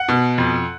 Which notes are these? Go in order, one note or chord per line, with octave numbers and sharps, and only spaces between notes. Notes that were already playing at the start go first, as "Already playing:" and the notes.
Already playing: F#5
B2
F2